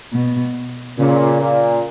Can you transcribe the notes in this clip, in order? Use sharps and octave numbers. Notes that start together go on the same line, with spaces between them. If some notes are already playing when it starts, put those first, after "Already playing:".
B2
A#2 C#3
A#2